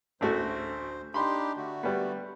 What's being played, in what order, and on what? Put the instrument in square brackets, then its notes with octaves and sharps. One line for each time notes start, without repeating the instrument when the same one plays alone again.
[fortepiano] A1 A3 F#4 [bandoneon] D2 C5
[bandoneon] D4 D#4 G4 [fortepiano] B5 C6
[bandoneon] D3 A3 F#4
[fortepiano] G3 B3